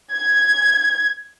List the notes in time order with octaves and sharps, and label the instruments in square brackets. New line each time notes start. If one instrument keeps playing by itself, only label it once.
[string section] G#6